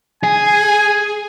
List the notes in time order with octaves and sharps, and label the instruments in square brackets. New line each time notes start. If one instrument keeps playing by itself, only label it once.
[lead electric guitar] G#4 [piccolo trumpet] G#5